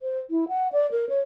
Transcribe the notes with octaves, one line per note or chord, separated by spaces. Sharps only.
C5
E4
F#5
D5
A#4
C#5